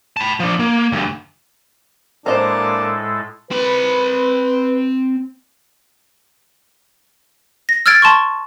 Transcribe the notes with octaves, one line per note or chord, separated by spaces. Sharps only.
A5 B5
F3 D4
A#3
D2 G2
A2 G#3 A#3 D4 A4 C5 D#5 A#5
C4 B4 B5
A#6
E6 F6 G#6 A6 D7
A5 C6 C#6